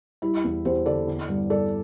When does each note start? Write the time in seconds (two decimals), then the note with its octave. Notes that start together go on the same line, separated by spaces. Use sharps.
0.22 G3 E4
0.44 E2
0.65 E2 G4 C5
0.86 D3 A4 D5
1.07 D3
1.29 G2
1.50 G2 A4 D5